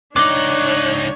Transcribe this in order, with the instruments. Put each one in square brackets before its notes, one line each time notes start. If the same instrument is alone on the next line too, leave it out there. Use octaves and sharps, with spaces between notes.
[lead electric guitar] C#2 D#4 [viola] D4 C#5 [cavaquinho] D6 [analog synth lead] F#6